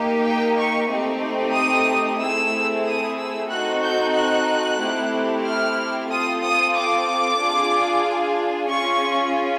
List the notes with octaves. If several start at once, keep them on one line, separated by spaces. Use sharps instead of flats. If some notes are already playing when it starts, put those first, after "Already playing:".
Already playing: A#3 D#4 G4
G5
C#6
A3 C4 D#4 G4
D#6
A3 C4 E4 G#4 E6
D#6
E6
C4 D#4 F#4 A4 F#6
G6
F#6
A3 C4 E4 G4
F6
C4 F4 A4 D#6
D#6
D6
D4 F4 G#4
C#4 F4 G#4 C#6